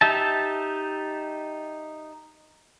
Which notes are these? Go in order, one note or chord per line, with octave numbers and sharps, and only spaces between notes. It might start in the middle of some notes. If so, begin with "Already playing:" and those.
D#4 G4 E5 A5